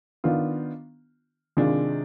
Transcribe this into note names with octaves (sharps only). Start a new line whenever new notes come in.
D#3 B3 D4 F4
C3 D#3 G#3 D4 F4